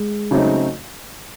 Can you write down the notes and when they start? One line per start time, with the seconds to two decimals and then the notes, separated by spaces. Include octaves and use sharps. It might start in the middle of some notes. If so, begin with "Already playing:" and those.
Already playing: G#3
0.31 C#3 F#3 A3 C4 D#4